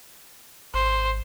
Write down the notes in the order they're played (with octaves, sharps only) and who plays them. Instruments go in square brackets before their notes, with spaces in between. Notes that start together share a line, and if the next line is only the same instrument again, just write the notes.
[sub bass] G#1 [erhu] C5